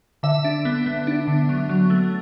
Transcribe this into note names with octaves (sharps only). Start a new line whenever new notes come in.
D3 E5
D4
B3
B3
D4
D3
F#3
F#3
A3